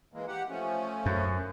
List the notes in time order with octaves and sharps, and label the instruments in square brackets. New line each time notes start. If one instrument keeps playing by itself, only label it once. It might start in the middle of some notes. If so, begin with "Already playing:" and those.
[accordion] E3 G#3 A#3
G4 F#5
F3 A3 C#4
[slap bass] F#2